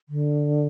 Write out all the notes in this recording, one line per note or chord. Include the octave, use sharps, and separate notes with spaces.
D3